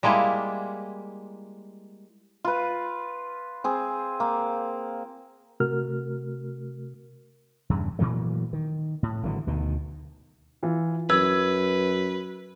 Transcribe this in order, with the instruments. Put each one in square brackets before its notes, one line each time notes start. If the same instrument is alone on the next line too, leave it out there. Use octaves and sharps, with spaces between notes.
[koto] G3 G#3 A#3 E4 F4
[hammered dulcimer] F4 B4
C4 G#4
A#3
[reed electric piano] C3 A3 F#4 A#4 F6
[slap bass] E2 G2 C#3
A#2 E3 F#3 A3
D#3
A2
G#1 D3 E3 F#3
D2 B2 D#3
[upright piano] E3 F4
[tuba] F#2 [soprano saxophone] B4 [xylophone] E6 [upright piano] G#6